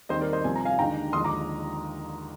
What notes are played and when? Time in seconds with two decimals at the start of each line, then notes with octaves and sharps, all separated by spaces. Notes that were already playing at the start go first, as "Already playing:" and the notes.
0.09 D#2 D#3 G3 C4 C5 D#5
0.21 A#4 D5
0.33 C5 D#5
0.44 C2 C3 F3 G#5
0.56 A#5
0.65 F5 G#5
0.79 D#2 D3 G#3 D4 G5 A#5
1.13 D#2 D3 F3 G#3 C6 D#6
1.24 A#5 D6